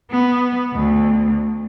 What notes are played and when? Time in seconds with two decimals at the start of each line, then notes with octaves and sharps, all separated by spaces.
0.11 B3
0.73 D2